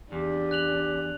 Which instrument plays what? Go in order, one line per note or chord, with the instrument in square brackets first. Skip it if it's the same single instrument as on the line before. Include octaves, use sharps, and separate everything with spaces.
[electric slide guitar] E2 [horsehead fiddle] D4 [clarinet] G4
[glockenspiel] F#6 F7 F#7